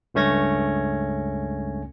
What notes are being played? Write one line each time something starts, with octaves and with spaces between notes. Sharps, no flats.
C#2 G2 A3 C#4 G#6 A#6